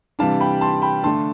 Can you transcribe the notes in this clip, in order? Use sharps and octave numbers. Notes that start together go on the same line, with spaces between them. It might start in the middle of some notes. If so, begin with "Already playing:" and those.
C3 E3 G3 D4 F5 A5
G5 B5
A5 C6
G5 B5
D3 A3 D4 A5 C6